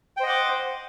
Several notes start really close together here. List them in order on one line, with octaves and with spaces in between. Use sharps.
G5 C5 D#5 F#5 D6